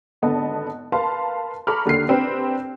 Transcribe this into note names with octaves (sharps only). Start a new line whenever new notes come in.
G#1 D3 B3 D#5 A5
A#4 B4 F5 A5 C6
A4 A#5 B5 C#6 D6 F6
D#2 D3 A#3 C7
C4 D4 G4 B4